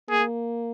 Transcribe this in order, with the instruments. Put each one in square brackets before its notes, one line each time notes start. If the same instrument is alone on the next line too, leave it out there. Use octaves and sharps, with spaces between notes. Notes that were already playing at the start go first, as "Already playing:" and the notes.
[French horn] A#3 [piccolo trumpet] G#4